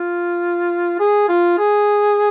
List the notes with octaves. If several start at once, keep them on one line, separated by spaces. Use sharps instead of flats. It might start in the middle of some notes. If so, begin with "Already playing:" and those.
Already playing: F4
G#4
F4
G#4